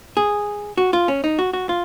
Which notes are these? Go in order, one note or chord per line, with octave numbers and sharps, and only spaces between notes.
G#4
F#4
F4
C#4
D#4
F#4
F#4
F4